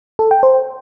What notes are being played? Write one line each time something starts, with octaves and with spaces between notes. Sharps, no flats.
A4
G5
C5